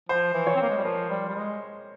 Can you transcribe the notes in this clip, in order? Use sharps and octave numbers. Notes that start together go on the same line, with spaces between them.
F3 C5
E3
C#5
C4
A#3
G#3
G3
F3 A#4
G3
G3
G#3